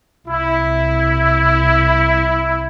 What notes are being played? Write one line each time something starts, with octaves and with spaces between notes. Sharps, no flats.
C2 E4